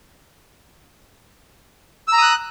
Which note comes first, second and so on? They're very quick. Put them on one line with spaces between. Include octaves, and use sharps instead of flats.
E6 A#5 D#6 F#6